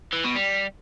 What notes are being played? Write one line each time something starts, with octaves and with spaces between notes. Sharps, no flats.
E3
B2
G3